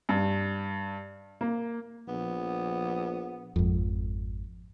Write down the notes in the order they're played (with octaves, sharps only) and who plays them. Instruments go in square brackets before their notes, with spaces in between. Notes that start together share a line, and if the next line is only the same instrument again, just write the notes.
[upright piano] G2
A#3
[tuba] A#1 [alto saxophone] B3
[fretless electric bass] G#1 F2